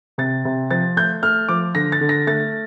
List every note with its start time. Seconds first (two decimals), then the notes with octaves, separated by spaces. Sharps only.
0.18 C3 A6
0.45 C3
0.71 F3 A6
0.97 A3 G6
1.22 A3 F6
1.49 F3 D6
1.75 D3 A#6
1.92 A6
2.01 D3
2.09 A#6
2.27 A3 A6